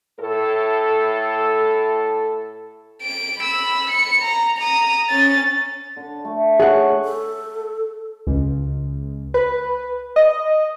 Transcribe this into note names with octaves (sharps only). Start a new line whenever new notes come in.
A2 A4
D7
B5 E6
C#7
A#5
A#5 D#6
C#4 A6
D3
A3
G#4 C#5 F#5
A4
C#2
B4
D#5